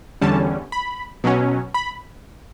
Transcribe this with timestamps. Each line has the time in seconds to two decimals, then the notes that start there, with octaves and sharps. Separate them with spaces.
0.21 E2 D3 G3 C#4 A5
0.72 B5
1.24 B2 F#3 C#4
1.74 B5